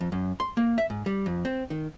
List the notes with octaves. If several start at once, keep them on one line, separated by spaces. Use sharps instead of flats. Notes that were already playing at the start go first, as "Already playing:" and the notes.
F2
F#2
C6
A#3
E5
G#2
G3
F2
C4
D#3